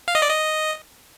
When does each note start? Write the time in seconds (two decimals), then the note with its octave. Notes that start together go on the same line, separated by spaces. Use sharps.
0.08 F5
0.15 D#5
0.22 D5
0.29 D#5